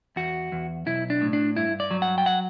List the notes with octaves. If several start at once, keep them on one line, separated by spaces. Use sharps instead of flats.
E2 F#4
E2
B1 E4
D4
A2
D4
G2 E4
D5
F#3
F#5
G5
F#5